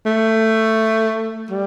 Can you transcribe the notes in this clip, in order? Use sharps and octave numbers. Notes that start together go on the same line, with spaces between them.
A3
G3